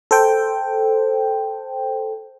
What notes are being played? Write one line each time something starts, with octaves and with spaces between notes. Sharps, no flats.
A4 C5 G5